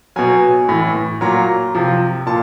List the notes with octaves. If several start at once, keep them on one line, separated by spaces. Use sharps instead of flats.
B2 F#3 G#5
A2 E3
A#2 F#3 A#5
C3 F3
A#2 A5